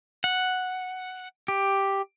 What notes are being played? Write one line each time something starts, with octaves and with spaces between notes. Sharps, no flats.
F#5
G4